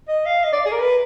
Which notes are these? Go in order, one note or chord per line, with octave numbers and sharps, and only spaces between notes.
D#5
F5
D#5
D5
G#4
A#4
B4